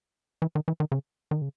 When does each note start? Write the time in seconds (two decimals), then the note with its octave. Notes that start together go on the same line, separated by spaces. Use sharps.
0.42 E3
0.55 D#3
0.68 E3
0.80 D#3
0.92 C#3
1.31 D#3
1.41 C#3